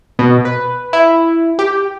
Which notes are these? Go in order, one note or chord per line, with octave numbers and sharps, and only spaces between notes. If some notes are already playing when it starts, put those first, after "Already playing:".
B2
B4
E4
G4